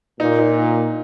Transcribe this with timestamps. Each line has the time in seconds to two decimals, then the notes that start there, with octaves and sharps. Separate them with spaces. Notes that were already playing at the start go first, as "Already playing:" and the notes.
0.20 A#2 D#4
0.39 D#4